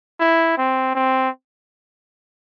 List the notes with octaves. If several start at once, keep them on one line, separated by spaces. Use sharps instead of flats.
E4
C4
C4